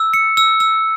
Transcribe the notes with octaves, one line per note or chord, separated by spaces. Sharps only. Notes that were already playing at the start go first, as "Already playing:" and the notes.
Already playing: E6
C#7
E6
E6